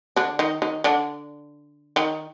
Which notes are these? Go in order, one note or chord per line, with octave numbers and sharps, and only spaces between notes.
D3 D4
D#3 D#4
D#3 D#4
D3 D4
D#3 D#4